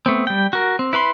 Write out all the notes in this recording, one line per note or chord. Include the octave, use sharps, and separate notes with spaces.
A3 B3 C4
G3 G5
F#4 A#4
C4
E4 B4 B5 C6